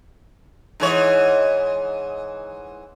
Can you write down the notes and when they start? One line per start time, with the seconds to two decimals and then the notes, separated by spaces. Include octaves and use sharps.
0.80 G#2 E3 C#5